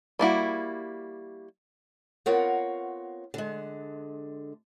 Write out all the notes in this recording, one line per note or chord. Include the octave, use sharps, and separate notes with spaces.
G3 A#3 E4 F#4
B3 C4 F4 A#4 C#5 F#5
D3 G#3